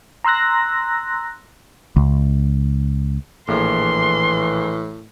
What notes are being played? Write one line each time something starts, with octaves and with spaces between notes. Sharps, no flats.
A#5 C6 E6 F#6 A#6
C#2
A#1 A2 E3 A#3 G#4 C6